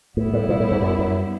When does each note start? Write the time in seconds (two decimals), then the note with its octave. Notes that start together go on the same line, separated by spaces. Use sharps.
0.17 A2 G3 B3 E4
0.33 A2
0.49 A#2
0.60 A2
0.71 G#2
0.82 F#2
0.99 F#2